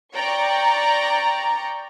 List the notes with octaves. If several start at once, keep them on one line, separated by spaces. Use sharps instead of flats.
D5 G5 A#5 C#6